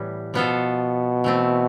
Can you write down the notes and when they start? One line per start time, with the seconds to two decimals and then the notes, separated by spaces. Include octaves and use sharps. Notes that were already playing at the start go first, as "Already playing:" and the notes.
Already playing: A2 E3 G3 B3
0.34 B2 F3 B3 F4 A4
1.24 E3 A3 C4